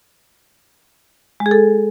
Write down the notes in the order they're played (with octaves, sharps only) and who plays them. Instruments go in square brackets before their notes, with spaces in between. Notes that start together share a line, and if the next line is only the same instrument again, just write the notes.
[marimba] G#3
G#4
A4